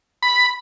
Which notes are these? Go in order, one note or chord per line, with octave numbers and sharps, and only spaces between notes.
B5